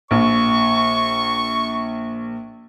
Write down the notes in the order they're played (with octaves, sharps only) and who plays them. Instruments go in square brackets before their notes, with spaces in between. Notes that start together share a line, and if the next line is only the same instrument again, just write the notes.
[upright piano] A#1 [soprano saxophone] C#6